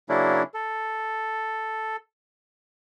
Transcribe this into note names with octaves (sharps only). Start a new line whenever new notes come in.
C#3 F#3 A#3 C#4 D4 E4
A4